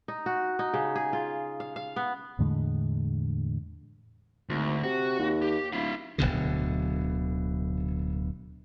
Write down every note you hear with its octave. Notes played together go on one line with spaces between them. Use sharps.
D#4
F#4
D#4
C#3
G#4
F4
F5
F5
B3
E2 A2 D3 G#3
G#1 D2
C3 F#4
D#2
G4
D1 E4 F5
D1 B1 B2 D3